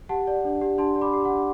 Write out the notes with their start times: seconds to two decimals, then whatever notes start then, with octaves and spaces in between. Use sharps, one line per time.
0.09 G4 F#5 A5
0.27 D5
0.45 D4
0.61 G4
0.78 D4 A5 C6
0.96 D5
1.01 B5 D6
1.13 G4
1.25 D4 F#5